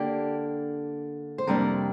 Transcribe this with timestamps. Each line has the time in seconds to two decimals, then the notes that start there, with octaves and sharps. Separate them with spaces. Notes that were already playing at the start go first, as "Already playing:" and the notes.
Already playing: D3 A#3 D4 G4
1.38 C5
1.47 F2 C3 G3 A#3 D4 A#4